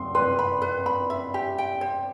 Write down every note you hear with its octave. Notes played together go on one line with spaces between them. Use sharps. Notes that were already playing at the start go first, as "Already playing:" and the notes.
Already playing: C6
B4 C6
B5
B4
B5
E5
G4
G5
C5